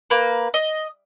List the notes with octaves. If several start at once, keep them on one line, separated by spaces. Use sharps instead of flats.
A#3 B4
D#5